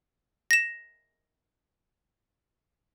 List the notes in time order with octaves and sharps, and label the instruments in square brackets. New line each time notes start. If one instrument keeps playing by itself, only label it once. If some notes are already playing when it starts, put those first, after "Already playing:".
[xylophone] A#6 E7